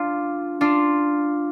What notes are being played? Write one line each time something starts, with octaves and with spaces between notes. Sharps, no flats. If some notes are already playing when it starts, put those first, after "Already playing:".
Already playing: D4 F4
D4 F4